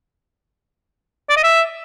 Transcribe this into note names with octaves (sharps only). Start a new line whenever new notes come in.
D5
D#5
E5